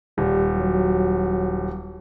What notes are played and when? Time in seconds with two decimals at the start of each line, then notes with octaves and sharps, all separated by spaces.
0.18 D#1 G3
0.57 F#3